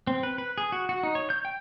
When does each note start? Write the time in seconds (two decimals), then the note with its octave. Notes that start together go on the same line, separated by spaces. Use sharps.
0.07 C4
0.23 B4
0.38 B4
0.58 G#4
0.72 F#4
0.89 F#4
1.03 D#4
1.15 C#5
1.30 G6
1.45 G5